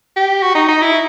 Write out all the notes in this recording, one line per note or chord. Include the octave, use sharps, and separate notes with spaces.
G4
F#4
D#4
D#4
E4